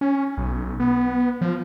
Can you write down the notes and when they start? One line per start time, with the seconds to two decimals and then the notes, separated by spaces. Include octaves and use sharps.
0.01 C#4
0.37 B1
0.80 B3
1.41 F3